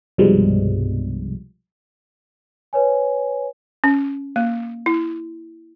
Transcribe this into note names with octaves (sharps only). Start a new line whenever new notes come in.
C2 G2 B2 F3 G3 G#3
B4 C#5 G#5
C#4
A#3
E4